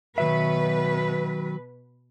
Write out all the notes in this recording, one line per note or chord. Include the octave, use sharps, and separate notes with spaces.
B2 D#3 F#3 B4 E5